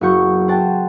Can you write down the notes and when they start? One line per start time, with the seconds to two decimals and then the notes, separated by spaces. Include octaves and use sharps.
0.01 F#1 B3 F#4 C#6 G6
0.48 C5 F#5 G5 A5 A6